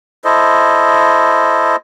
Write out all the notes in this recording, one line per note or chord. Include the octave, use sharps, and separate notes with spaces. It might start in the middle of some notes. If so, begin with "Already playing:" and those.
E4 A4 C5 D#5